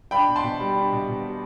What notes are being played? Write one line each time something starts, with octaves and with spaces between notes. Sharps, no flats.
D4 G5 B5
B2
A5 C6
B2
G3
D4
B2
B2
G3